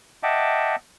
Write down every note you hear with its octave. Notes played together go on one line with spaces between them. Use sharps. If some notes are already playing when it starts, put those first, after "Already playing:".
D#5 E5 F#5 G5 A5 D6